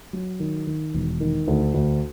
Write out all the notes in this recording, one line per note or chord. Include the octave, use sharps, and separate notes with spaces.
F#3
D#3
D#3
E1
D#3
D2
D2